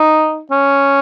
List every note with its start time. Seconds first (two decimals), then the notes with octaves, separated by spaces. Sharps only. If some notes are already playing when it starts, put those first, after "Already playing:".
Already playing: D#4
0.51 C#4